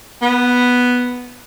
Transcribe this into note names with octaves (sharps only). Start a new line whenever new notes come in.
B3